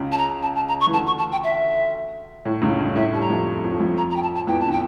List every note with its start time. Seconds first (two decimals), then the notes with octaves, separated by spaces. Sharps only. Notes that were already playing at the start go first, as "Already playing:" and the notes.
Already playing: C#2 C#3
0.12 A5
0.18 A#5
0.42 A5
0.56 A5
0.68 A#5
0.81 C#6
0.87 E3
0.93 D2 D3 A5
1.06 C#6
1.18 A5
1.32 G5
1.44 E5
2.45 A2
2.62 C#2 C#3
2.79 G2
2.96 A2 E5
3.13 G2 G3 A5
3.21 A#5
3.30 F2 F3
3.64 F2 F3
3.80 F2 F3
3.98 A#5
4.10 A#5
4.16 G5
4.23 A5
4.35 A5
4.47 E2 E3 G5
4.60 D3 A5
4.72 G5